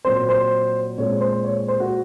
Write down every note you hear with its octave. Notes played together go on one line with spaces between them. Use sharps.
A#2 F#3 C4 C5
C5
A#2 G#3 C4 C#5
C5
C#5
C5
F#4